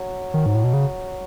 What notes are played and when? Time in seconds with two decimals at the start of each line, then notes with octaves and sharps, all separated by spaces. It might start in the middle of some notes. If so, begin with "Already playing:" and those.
Already playing: F#3
0.34 D#3
0.46 G#2
0.55 A2
0.64 B2
0.73 C#3